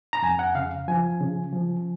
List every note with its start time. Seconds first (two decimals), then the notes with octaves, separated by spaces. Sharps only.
0.13 A#5
0.22 F2 G#5
0.39 F#5
0.55 C#3 F5
0.88 F3 G#5
1.21 C#3
1.53 F3